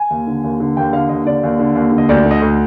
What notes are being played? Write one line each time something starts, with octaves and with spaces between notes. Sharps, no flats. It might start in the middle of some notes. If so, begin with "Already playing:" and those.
Already playing: G#5
D#2
D3
D#2
D3
D#2 G5
D3 F5
D#2 D#5
D3 D5
D#2
D3
D#2
D3
D#5
D2 D5
D3
D#5
D2